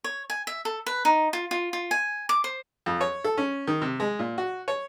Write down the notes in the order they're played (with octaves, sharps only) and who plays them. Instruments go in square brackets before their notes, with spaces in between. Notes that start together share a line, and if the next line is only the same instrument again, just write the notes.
[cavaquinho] C#5
G#5
E5
A4
B4
D#4
F4
F4
F4
G#5
D6
C5
[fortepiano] F2
C#5
A4
C#4
D#3
C3
G#3
A#2
F#4
C#5